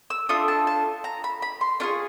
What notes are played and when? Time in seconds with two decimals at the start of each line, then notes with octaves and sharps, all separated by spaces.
0.10 E6
0.29 A3 D4 F4 D#6
0.48 A5
0.67 A5
1.04 A#5
1.24 B5
1.42 B5
1.61 C6
1.80 D4 F4 G#4 C#6